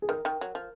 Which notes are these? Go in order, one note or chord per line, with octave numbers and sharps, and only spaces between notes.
G#4
D#3 A#4
D#3
F#3
F3